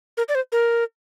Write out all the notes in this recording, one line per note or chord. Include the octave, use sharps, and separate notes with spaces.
A#4
D5
C5
A#4